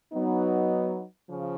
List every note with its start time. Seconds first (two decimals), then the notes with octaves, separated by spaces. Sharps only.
0.11 F#3 B3 D#4
1.28 C#3 F3